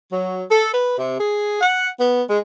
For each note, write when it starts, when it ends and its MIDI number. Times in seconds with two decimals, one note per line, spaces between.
0.12 0.43 54
0.51 0.71 69
0.73 0.95 71
0.97 1.18 48
1.19 1.60 68
1.61 1.88 78
2.00 2.22 59
2.29 2.38 56